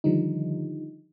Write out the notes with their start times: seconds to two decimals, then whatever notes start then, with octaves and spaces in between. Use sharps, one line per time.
0.04 D3 D#3 F3 G3 D#4